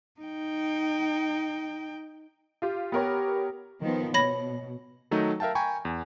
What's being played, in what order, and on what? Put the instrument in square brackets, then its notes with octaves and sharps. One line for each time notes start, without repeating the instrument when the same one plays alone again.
[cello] D#4 G5
[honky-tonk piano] F4 G4
[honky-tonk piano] B3 A#4 C#5 [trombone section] G4
[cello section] D#3 F3 B3
[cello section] B2 [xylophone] C#5 B5 A#6
[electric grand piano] D#3 F#3 A3 D#4
A#4 E5 F5 G5 A5
G5 G#5 A#5 B5 C#6
E2